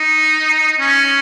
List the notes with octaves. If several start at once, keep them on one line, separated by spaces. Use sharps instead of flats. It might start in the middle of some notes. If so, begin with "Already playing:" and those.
Already playing: D#4
C#4